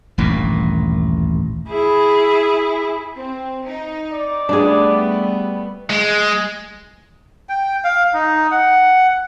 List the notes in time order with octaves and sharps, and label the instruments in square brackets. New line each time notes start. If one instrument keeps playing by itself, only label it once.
[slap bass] D#1 A1 G2 A#2
[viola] E4 G#4
[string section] C4
D#4
[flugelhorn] D5
[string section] G3 A3 B3 [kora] D4 G#4
[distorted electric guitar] G#3
[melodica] G5
F5
D#4
F#5